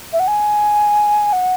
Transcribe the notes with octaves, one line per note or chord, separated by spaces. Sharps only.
E5
F#5
G#5
F#5